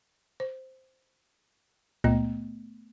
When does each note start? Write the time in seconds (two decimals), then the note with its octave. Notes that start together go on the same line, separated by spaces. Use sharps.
0.40 C5
2.04 C#2 A#2 A3 B3 D#5